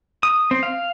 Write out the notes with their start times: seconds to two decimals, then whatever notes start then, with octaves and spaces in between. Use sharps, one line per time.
0.23 D#6
0.51 C4
0.63 F5